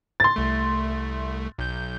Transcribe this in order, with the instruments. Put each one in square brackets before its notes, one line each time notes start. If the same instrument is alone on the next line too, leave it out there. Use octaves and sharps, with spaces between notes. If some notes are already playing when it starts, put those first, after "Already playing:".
[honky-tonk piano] C6 A6
[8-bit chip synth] C2 A3
B1 G6